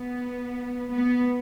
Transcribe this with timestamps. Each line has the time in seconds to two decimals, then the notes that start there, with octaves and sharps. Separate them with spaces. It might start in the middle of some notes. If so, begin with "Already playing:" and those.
Already playing: B3
0.89 B3